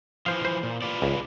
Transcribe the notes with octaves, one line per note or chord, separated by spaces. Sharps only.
E3 F3 C5 F5
C5
A#2
F4 B4 D5
C#2